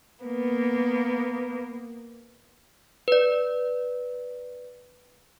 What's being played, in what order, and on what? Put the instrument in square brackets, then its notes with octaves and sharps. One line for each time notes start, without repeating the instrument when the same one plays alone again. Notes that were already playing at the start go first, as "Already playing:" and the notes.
[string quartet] A#3 B3
[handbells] B4 D5